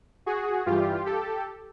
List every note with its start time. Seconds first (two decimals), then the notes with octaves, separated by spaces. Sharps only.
0.26 F#4 G#4
0.66 G2 E3 G3 F4 G4
1.06 G4 A4